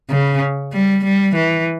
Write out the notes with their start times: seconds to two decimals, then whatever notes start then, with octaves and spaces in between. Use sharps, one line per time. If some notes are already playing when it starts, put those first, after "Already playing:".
0.11 C#3
0.73 G3
1.05 G3
1.35 E3